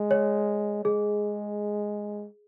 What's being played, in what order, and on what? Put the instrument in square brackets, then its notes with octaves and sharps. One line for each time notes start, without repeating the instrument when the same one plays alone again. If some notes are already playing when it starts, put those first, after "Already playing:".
Already playing: [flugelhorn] G#3
[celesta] C#5
[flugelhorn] G#3 [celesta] G#4